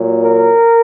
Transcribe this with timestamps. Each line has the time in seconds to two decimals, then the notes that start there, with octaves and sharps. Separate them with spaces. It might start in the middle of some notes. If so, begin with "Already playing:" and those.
Already playing: A#2 F#3
0.22 A#4